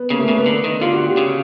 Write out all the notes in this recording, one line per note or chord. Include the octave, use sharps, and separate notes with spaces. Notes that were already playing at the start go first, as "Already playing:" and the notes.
Already playing: B3
C#3 A#3
A3
C#3 A#3
B3
D3
D#3
D3 F4
F#4
G4
C#3